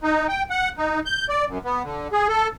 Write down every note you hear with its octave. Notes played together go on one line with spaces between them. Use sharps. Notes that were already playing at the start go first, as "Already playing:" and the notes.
D#4
G5
F#5
D#4
G6
D5
F#2
B3
D3
G#4
A4